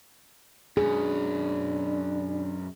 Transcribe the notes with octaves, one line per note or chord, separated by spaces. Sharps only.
F#2 B2 D4 G#4